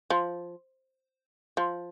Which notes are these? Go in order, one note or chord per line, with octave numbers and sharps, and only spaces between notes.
F3
F3